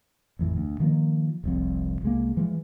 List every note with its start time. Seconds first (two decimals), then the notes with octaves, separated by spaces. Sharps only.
0.39 A1 F2 E3
0.57 D2
0.80 D#3 F3 A#3
1.44 F1 C2 F2
2.03 C2 G#3 A#3
2.37 E3 F3 G#3